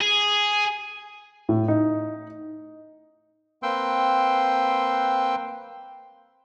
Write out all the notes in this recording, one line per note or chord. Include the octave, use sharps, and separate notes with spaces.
G#4
A2
D#4
A#3 C4 B4 G5 C6 E6